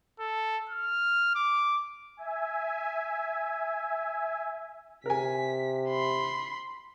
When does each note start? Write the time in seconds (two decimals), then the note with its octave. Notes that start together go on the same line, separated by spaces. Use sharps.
0.20 A4
0.70 F6
1.35 D6
2.17 E5 G#5
5.06 C3 A#4 G#5 B6
5.89 B5 C6